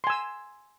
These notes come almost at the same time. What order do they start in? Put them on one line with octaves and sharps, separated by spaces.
C6 G#5 E6